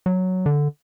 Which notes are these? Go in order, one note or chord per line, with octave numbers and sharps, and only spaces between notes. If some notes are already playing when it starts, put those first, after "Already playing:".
F#3
D3